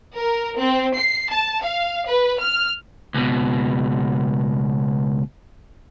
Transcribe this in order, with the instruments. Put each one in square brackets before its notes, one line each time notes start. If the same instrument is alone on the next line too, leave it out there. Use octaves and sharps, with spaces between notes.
[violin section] A#4
C4
C7
A5
F5
B4
F6
[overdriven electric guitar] C#2 B2